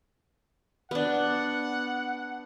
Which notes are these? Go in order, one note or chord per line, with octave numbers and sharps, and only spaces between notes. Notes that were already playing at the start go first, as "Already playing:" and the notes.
B3 D4 F#5